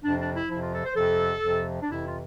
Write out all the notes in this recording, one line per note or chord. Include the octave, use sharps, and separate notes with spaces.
F2 C3 F3 D4
D4
E4
F2 C3 F3 E4
F4
A4
C5
F2 C3 F3 A4
F2 C3 F3
D4
F2 C3 E3 E4
F4